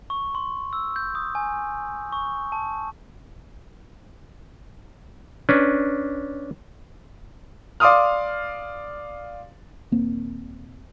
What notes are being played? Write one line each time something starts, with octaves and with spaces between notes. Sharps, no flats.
C#6
C6
E6
G6
D#6
G#5
C#6
A5
C#4 D4 B4
D5 F5 C6 D6 D#6 F6
D#1 A#3 C4